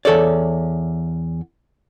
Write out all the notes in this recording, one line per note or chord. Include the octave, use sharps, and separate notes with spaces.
E2 A4 C#5 D5